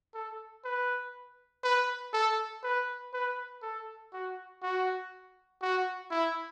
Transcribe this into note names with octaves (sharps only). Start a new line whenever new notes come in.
A4
B4
B4
A4
B4
B4
A4
F#4
F#4
F#4
E4